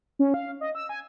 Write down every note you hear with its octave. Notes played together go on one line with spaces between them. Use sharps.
C#4
F5
D#5
E6
G#5